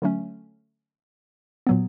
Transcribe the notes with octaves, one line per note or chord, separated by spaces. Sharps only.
D3 F#3 A3 C#4
A#2 F#3 B3